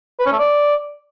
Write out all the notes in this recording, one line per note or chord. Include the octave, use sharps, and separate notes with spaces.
B4
C#4
A3
D5